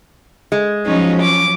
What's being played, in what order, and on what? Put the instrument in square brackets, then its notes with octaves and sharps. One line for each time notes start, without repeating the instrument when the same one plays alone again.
[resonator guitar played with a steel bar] G#3
[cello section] F3 F#3 C#4 [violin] D#4
[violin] D6